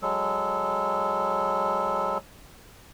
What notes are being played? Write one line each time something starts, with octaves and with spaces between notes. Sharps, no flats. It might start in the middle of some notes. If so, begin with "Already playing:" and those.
F#3 G#3 A4